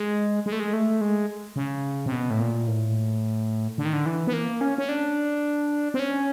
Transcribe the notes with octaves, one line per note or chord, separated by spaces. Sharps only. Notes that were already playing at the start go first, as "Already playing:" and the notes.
Already playing: G#3
G#3
A3
G#3
A3
G#3
C#3
C3
B2
A2
A#2
A2
D3
D#3
D3
E3
B3
A#3
C#4
C#4
D4
C4
C#4